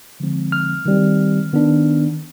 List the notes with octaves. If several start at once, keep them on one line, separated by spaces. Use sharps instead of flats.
D3 F3 G#3 C4
F6
D#3 G3 C4
D#3 B3 D4